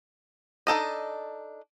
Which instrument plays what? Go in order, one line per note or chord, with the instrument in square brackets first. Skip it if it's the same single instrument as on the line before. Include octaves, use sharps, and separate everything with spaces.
[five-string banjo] D4 D#4 A4 D#5